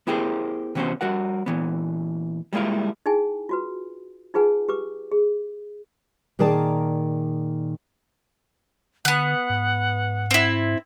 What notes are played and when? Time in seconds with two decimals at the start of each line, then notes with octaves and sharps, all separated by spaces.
0.07 B3 E4 G4 G#4 A#4 C5
0.75 C3 E3 B3 C#4 F#4 C5
1.01 G3 F#4 A#4 F#5
1.46 A#2 E3 B3
2.53 G3 G#3 A#3 E4 F4
3.06 D#4 E4 G#4 G5 G#5
3.49 F4 F#4 B4
4.34 D#4 F4 G#4 B4 F#5 G#5
4.69 G4 B4 D6
5.12 G#4
6.39 A#2 D#3 G#4 A#4 D5 A5
9.05 D3 B3 F#5 F#6
9.50 G#2
10.31 C4 E4